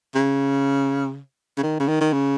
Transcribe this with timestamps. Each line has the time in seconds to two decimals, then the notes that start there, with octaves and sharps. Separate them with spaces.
0.15 C#3
1.58 C#3
1.63 D#3
1.80 C#3
1.88 D#3
2.01 D#3
2.13 C#3